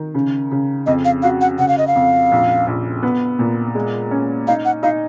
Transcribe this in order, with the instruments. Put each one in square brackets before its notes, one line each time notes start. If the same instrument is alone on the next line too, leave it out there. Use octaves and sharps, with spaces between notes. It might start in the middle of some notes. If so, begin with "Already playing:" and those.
Already playing: [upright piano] D#3
C#3
C#3
[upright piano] F2 [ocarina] D#5
[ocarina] F5
[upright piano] F#4 [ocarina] F5
[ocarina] F#5
[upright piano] C#3 [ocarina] F#5
[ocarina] F5
D#5
F5
[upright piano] F2
A#1
A#1
B3
A#2
G#3
C#4
[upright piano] D#4 [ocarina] F5
[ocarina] F#5
[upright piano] D#4 [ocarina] F5